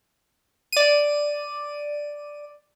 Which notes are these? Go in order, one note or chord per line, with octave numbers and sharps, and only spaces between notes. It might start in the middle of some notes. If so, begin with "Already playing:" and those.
D5 D#7